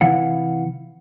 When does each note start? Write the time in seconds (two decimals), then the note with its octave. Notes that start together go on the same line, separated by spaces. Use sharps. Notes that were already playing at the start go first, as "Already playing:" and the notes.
0.01 C3 E3 E4 F5 F#5